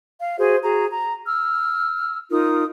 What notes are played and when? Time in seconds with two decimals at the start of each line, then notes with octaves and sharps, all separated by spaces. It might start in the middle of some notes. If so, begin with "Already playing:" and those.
0.19 F5
0.37 F#4 G#4 C5
0.63 F#4 G#4 A#5
0.90 A#5
1.26 E6 F6
2.31 D#4 F4 A#4 D#6